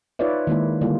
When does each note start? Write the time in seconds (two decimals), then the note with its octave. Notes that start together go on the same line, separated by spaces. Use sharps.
0.19 D#4 F4 B4 C#5 D5 E5
0.47 D#3 G#3 A#3 E4
0.81 D3 G3 A#3 E4 F4